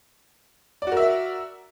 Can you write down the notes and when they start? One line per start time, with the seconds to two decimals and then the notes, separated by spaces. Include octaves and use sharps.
0.82 D5
0.87 F#4
0.92 A#4
0.97 E5